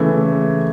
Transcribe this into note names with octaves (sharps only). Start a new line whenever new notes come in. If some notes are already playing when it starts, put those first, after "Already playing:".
Already playing: C#3 E3 A3